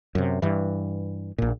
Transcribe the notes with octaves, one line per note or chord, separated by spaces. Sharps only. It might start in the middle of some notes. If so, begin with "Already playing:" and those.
F#2 C3
G2 E3
A#1 A#2